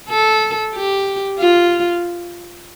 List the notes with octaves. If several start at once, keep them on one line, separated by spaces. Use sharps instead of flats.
A4
G4
F4